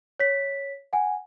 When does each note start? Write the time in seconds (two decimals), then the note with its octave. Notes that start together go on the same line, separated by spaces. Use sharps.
0.20 C#5 B6
0.93 F#5 G#5